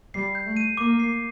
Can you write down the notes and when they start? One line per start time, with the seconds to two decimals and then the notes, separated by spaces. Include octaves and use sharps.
0.14 G3 C7
0.35 G6
0.45 A3
0.57 D#7
0.77 A#3 D6
1.00 C7